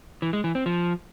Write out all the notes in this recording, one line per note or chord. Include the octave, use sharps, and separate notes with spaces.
E3
G#3
E3
C4
F3